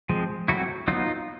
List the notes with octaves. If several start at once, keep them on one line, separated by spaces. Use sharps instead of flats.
F3 G#3 C4
F#3 A3 C4 E4 F#4
F#3 B3 D#4 F4